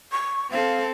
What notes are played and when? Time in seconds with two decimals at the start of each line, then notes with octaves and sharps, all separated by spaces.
0.11 C#6
0.51 C4 A4 F5